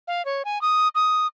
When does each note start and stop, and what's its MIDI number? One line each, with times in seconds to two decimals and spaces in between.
0.08 0.25 77
0.25 0.43 73
0.45 0.61 80
0.61 0.88 87
0.95 1.27 87